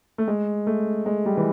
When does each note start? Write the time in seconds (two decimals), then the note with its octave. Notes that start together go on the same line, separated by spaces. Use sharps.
0.18 A3
0.28 G#3
0.67 A3
1.06 G#3
1.26 G3
1.37 E3